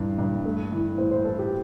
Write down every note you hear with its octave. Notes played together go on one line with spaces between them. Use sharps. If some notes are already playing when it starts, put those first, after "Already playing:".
Already playing: G2 E3
G2
A3
E3
A2 C5
C5
A2 A4
G4